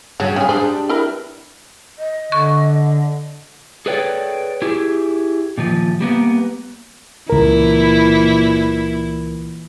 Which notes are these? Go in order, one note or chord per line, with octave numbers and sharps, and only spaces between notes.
G2 C#3 F#3 F#4
C#3 F4 G#4
G3 G#3 D4 G#4 C5
E4 A#4 B4
D#5
D3 C#6
G#4 A4 B4 C#5 D5 G5
E4 G4 G#4
A#2 D#3 F3
G3 A#3 B3
C#2 A#2 E3 E4 A#4